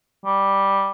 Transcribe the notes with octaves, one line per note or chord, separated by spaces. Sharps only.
G3